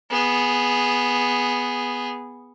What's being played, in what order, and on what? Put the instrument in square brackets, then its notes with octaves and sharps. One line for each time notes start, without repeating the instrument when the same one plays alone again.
[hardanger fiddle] B3 G#4